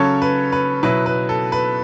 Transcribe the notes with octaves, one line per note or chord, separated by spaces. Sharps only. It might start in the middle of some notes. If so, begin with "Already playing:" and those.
Already playing: C#3 F#3 C#4 A4 C#5
B4
B4
B2 F#3 B3 E4 B4
B4
A4
B4